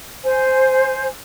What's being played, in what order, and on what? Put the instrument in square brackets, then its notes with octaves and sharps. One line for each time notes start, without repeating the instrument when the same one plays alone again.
[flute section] C5 G#5